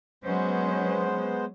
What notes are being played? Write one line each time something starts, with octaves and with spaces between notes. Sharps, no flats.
F#3 G#3 B3 C#4 C5